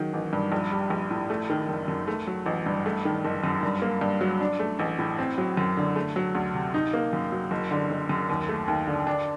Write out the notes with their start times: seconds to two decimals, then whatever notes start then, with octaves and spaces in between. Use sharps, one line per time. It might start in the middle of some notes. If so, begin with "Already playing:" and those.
Already playing: D#3 F#3
0.14 A1
0.33 G2
0.52 A#1
0.71 G3
0.90 A#1
1.11 A2
1.30 A3
1.50 D#3
1.69 F#1
1.88 F#2
2.07 A3
2.27 F#3
2.46 A1
2.66 G2
2.86 A3
3.05 D#3
3.25 F#1
3.44 F#2
3.63 G2
3.82 A#3
4.01 G2
4.21 F#3
4.41 D4
4.59 A3
4.79 A1
4.99 A2
5.18 C4
5.38 F#3
5.57 F#2
5.77 D3
5.96 A3
6.16 F#3
6.35 D2
6.54 C3
6.74 D#4
6.93 A#3
7.13 F#2
7.32 F#3
7.51 F#1
7.71 D3
7.91 F#1
8.09 F#2
8.29 D#2
8.49 A3
8.68 D#2
8.87 D3
9.07 D4